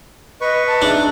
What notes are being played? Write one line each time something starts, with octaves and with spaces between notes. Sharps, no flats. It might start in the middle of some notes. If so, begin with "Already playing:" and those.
B4 D#5 C#6
A5
D4 D#4 G#4 E5